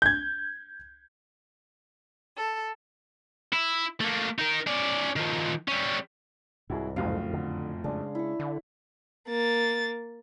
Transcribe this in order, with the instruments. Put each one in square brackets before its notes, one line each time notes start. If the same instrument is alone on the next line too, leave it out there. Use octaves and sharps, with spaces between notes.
[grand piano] G6 G#6
[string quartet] A4
[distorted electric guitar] E4
A3 A#3
D#4 A#4
C#4 D5
D#3 F3
G3 C#4
[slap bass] C2 G#2 [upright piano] E4 F#4 G#4
[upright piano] F#1 A2 F#3 [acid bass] F2 [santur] F5
[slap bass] D3
[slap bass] C#3 G#3 [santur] D4
[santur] E4 C#6
[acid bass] D3 [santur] E4
[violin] A#3 A6